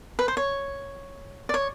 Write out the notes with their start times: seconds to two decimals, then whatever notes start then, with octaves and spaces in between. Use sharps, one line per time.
0.19 B4
0.28 C5
0.37 C#5
1.49 D5
1.54 C#5